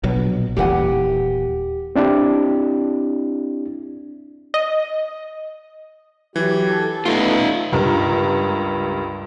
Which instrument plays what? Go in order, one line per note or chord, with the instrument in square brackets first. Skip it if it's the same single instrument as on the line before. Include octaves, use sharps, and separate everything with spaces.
[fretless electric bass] A#1 B2 F#3
[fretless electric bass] D#1 A#2 E3 [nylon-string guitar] G4 F#5 G#5
[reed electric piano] C4 D4 E4 G4
[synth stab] D#5
[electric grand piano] E3 [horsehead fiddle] F#3 E4 [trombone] G4
[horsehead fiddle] A4
[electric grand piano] A3 [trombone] B3 [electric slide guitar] D#4 F4
[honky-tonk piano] C#2 G2 A#4